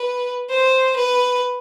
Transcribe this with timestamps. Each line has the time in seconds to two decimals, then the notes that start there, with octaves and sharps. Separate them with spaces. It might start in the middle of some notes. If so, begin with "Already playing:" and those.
Already playing: B4
0.50 C5
0.96 B4